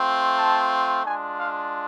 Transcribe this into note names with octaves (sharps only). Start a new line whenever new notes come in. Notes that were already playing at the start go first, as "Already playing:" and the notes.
Already playing: A3 C4 F4
A5
G#3 D4 F4 G#5
F5